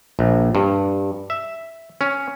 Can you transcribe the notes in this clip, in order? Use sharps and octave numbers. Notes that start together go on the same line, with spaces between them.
A#1
G2
E5
C#4